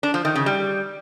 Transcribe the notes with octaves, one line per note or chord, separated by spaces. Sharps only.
D4
F3
D#3
C#3
G3